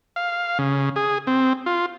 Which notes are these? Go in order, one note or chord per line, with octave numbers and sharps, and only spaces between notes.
F5
C#3
G#4
C4
F4